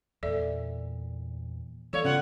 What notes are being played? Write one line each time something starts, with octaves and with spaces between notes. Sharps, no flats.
E2 A#2 A4 D5 E5
E3 B3 A4 C#5 D5 F5
C#3 F4 F#5